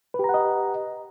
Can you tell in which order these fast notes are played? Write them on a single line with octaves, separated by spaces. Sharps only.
B4 G4 A#5 F#5 D#5